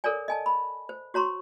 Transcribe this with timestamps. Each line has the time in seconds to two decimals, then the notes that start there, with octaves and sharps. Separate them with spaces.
0.04 A4 A#4 C#5 D5 G#5
0.28 D#5 G#5 A5
0.46 B5
0.89 C5
1.14 F#4 C#5 A#5 C6 C#6